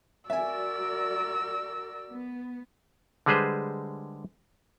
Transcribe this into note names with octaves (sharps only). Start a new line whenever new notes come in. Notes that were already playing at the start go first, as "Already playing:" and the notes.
F#4 A#4 D5 E5 G#5 E6
B3
D3 G3 G#3 G#4 B4 C5